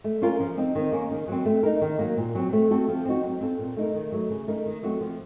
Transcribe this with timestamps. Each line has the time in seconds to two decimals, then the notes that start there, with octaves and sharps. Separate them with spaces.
0.04 A3
0.22 C#4 F4 A#4
0.40 F3
0.57 C4 D#4
0.75 D#3
0.92 A#3 C#4
1.11 D#3
1.28 F#3 C4
1.45 A3
1.63 D#4 A#4
1.81 D#3
1.99 F#3 A#3
2.17 A#2
2.35 F#3 C4
2.53 A3
2.71 C4 F#4 A4
2.88 F3
3.05 C4 D#4 F#4
3.23 F#3
3.41 C4 F4 A4
3.58 A#2
3.77 A3 D#4 A#4
3.94 D#3
4.12 F#3 A3
4.30 C#3
4.48 A3 D#4 A#4
4.66 D#3
4.83 F#3 A3 C4 F#4
5.01 F3